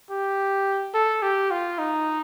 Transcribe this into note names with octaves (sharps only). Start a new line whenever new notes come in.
G4
A4
G4
F4
D#4